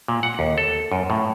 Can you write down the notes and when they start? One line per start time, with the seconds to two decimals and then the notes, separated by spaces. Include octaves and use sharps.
0.08 A#2
0.23 F#5
0.39 D#2
0.58 A4
0.92 F#2
1.10 A2